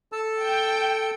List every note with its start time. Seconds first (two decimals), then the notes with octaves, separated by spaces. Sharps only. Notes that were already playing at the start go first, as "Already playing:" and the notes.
0.12 A4 A5 E6
0.42 G5